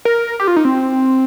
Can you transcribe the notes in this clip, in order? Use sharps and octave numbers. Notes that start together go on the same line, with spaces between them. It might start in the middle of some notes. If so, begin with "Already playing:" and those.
A#4
G4
F4
D#4
C4